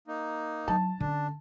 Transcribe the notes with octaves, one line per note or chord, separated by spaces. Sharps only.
A#3 D#4
F#3 A5
D3 C#4 D4